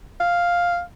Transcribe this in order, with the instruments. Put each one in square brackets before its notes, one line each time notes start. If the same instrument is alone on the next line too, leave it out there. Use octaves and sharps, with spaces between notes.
[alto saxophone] F5